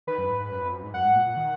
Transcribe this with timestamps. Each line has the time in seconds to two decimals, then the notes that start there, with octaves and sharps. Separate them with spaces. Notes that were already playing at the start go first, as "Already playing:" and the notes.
0.07 D#3 B4
0.18 F#2
0.29 G#2
0.40 G#2
0.51 F#2
0.61 F2
0.72 F#2
0.83 G#2
0.94 F#2 F#5
1.04 G#2
1.15 A#2
1.26 A#2
1.37 D#3